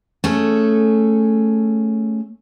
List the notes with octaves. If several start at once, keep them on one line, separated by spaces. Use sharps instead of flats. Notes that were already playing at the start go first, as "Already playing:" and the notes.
A3 C#4 G#4 A4